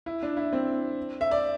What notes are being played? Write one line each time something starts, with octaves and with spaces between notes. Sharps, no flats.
E4
D4
E4
C4
E5
D5